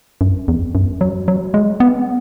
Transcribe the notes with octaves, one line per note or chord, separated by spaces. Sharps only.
F#2
E2
F#2
F#3
F#3
G#3
B3